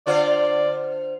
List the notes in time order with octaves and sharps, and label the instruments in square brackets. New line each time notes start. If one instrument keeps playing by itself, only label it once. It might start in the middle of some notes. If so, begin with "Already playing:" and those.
[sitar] D3 F4 C5 [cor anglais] D5